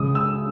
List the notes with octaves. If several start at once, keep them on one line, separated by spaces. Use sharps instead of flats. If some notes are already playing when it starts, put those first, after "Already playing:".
Already playing: C#2 D#6
E6